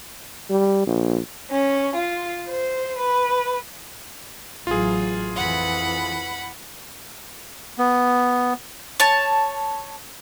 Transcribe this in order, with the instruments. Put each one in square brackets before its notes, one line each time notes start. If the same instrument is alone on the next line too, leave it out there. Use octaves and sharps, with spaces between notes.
[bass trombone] G3
A#1
[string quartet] C#4
F4
C5
B4
[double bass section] A1 E3 F#3 [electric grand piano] F4 G#4
[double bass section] F2 E3 [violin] F#5 B5
[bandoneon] B3
[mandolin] C#5 A5